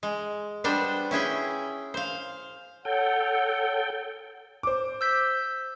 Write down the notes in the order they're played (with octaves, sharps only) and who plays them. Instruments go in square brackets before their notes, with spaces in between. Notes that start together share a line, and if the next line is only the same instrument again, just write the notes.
[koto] G#3
G3 B3 D4 C5
C#4 E4 G#4 G5
C5 F5
[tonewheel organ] A4 G5 [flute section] C#5 F#5
[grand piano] C5 D6
[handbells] E6 G6 B6